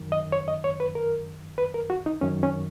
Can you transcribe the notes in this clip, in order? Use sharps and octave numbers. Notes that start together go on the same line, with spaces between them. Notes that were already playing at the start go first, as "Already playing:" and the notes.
Already playing: F#2 D#3
D#5
C#5
D#5
C#5
B4
A#4
B4
A#4
F#4
D#4
F#2 D#3 C#4
C#4